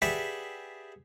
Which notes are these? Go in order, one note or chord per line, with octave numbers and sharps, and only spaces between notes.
G4 G#4 B4 D5 E5 F#5